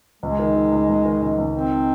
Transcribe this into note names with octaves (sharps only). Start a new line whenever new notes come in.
C#2 G#3
D#3
D#3
C#2
C#2
D#3
C#2
C#2
D#3 C4